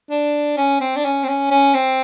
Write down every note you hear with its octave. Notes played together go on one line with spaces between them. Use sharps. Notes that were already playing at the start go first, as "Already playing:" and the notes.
D4
C#4
C4
D4
C#4
C4
C#4
C#4
C4